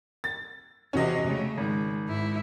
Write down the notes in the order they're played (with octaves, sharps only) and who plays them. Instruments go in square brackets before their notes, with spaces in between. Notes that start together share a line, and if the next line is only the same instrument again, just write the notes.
[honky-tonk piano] A6
[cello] E2 C3 [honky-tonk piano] C#4 F#4 D#5
[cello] C#3 A3
[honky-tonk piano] G#1 [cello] G#3
[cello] G#2 E4